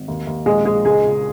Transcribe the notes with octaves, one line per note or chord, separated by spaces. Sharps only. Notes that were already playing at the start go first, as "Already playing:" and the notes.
Already playing: G#1
D#2
D#2
A#1 G#3 G#4
A#1 G#3 G#4
C#2 G#3 G#4
C#2